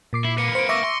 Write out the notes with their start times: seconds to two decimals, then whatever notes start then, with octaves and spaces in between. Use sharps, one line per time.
0.13 A#2 D6 C7
0.25 E4
0.38 A#3 B4 C#7
0.55 C5 C#7 D7
0.69 E5 C#6 D6 A#6
0.84 C6